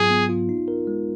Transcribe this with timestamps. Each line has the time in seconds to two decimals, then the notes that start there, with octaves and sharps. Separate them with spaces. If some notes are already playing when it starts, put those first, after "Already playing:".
Already playing: G#2 F#3 B3 F4 G#4
0.10 B3
0.29 F4
0.49 D#4
0.68 A#4
0.87 G#3